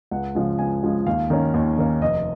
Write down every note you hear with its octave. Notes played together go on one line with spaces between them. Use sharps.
C#2 F#5
C#3 F3 G#3
C#2 G#5
C#3 F3 G#3
D#2 F5
D#3 A#3 C#4
D#2
D#3 A#3 C#4
F1 D#5